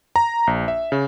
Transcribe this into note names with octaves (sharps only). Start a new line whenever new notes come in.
A#5
A#1
E5
C#3